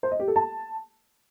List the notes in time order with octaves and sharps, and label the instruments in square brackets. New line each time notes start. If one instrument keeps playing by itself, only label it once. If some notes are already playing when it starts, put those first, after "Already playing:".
[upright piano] C5
D#5
G4
A4
A5